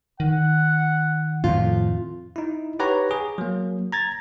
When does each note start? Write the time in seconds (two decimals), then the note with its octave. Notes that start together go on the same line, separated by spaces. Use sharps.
0.20 D#3 F#5
1.44 F2 A2 F4
2.36 D#4 E4
2.79 D#4 G4 B4 C#5 F#5 A#5
3.11 G#4
3.38 F#3 A#3
3.92 A#5 G#6 A6